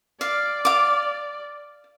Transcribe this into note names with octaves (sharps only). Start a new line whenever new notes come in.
D5 F5
F5 D6